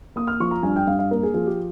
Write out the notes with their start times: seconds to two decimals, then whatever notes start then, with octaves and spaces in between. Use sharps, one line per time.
0.16 A#3 D#6
0.27 F6
0.40 F3 C#6
0.51 A#5
0.63 G2 G#5
0.76 G5
0.87 G2 F5
0.99 F5
1.11 A#3 A#4
1.23 G#4
1.34 F3 G#4
1.47 G4